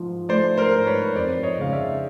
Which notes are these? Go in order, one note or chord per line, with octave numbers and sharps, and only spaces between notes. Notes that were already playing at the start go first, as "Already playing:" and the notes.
Already playing: G#2 F3
A3 C5 D5
A#4 C5
G#2
B4 C#5
F2 C5 D5
C#5 D#5
C#3 F5
D5 E5